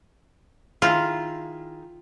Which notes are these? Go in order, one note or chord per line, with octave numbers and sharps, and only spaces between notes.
D#3 E4 F4 G#4